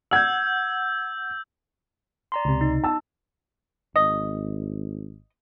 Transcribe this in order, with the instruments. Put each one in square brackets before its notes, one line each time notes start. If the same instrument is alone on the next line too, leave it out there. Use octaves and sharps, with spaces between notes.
[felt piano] F#5 G#6 [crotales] E6 G6
[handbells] D5 A#5 C6
[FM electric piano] C#2 C3
[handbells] D#4
[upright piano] A5 E6
[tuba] G#1 [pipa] D#5